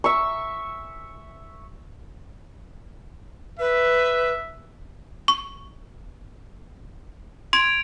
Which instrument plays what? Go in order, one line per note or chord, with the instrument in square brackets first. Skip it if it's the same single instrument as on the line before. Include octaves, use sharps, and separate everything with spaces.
[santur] E5 C#6
[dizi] B4 [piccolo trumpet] E5
[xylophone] C#6
[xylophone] C6 [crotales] G#6 D7 F7